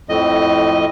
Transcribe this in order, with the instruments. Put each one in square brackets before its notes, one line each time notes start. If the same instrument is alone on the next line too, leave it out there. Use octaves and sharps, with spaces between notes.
[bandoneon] F2 A2 D#5